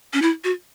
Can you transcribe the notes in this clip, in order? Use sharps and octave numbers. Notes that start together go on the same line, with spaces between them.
C#4
E4
F#4